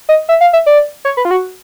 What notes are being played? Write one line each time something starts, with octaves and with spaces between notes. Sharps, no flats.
D#5
E5
F5
E5
D5
C#5
B4
F4
F#4